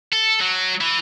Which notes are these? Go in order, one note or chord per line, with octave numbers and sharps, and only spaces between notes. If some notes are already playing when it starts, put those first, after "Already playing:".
A4
F#3
E3